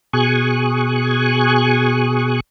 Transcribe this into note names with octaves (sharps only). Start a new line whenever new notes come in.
B2 G#4 G#5 C#6 F#6